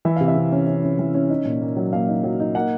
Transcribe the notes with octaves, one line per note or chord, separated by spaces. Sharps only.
E3 E5
C3 F5
E5
C3
C#4
C#4
C#4
E3
C#4
D#4
A#2
A#3
F#3
A#3 F5
D#4
F#3
D#4
A#3 F#5